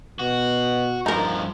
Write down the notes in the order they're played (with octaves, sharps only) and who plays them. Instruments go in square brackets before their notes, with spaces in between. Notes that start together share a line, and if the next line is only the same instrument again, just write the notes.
[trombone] B2 [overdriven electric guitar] F#4
[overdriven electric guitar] G2 F3 [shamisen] D#4 A#4